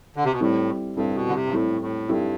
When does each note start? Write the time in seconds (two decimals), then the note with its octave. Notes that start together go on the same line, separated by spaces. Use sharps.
0.16 D3
0.24 C3
0.32 B2
0.41 A2 G3 C4 E4 A4
0.96 G2 G3 C4 E4 A4
1.15 B2
1.29 D3
1.35 C3
1.46 G2
1.52 A2 G3 C4 E4 A4
1.81 A2
2.09 G2 G3 C4 E4 A4